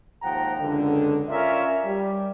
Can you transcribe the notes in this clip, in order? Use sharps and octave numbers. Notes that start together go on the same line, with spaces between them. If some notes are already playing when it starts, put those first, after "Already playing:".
D#2 G#2 F3 F#5 G5 A#5
C#2 F#2 D3
C#4 F4 A#4 D5 E5
G3